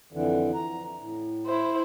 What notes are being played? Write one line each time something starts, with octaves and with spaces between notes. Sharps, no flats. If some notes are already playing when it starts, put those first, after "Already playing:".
F2 D3 E3
A#5
A2
E4 C5